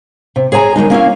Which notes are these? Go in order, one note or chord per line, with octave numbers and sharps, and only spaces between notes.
C3
G#4 C#5 G#5 A#5
D#3 F#3 G#3 D#4
A#3 C#4 E4 F5